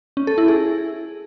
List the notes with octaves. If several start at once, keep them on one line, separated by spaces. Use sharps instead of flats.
C#4
A4
E4
G#4